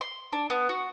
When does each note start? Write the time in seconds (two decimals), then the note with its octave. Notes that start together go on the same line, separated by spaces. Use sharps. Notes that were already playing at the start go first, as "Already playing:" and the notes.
0.01 C6
0.33 D4
0.50 B3
0.69 F#4